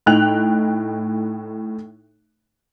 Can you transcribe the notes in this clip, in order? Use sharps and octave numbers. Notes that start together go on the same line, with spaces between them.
A2 D#4 G5 F#6 F7